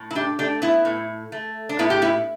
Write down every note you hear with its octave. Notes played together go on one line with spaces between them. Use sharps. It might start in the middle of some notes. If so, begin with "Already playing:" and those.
Already playing: A2
E4
D4 G4
A3 D4 G4
B3 E4
A2
A3
D4
A2 B3 E4
G4
B3 E4